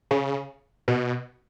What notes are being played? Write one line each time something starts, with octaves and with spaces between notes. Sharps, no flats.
C#3
B2